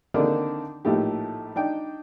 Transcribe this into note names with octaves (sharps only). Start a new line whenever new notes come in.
D3 D#3 A#3 C4 D4 D#4
A#1 A2 A3 D#4 G4
D4 D#4 G5